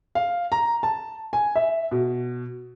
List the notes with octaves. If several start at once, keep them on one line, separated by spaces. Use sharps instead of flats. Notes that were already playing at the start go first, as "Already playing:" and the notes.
F5
A#5
A5
G#5
E5
B2